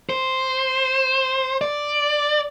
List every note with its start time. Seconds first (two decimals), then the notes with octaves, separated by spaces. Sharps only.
0.10 C5
1.61 D5